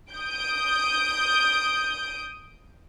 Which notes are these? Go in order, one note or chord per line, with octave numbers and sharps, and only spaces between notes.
D#6 G6 D7